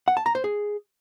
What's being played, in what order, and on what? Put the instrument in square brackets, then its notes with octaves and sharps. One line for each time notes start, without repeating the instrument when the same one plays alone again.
[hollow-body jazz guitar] F#5
A5
A#5
C5
G#4